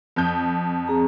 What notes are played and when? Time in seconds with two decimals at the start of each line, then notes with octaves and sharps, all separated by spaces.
0.16 F2 G6
0.88 C4 G#4 A#5